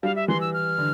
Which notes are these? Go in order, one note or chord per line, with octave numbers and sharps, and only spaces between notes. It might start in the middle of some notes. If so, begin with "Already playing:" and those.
G3 F5
E5
E3 C6
E6
F6
D3